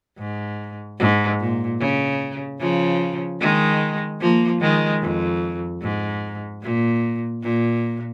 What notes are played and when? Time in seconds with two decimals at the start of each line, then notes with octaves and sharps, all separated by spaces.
0.18 G#2
0.99 G#2
1.39 A#2
1.80 C#3
2.60 C#3 F3
3.40 D#3 G#3
4.20 F3 A#3
4.61 D#3 G#3
5.01 F2
5.82 G#2
6.62 A#2
7.43 A#2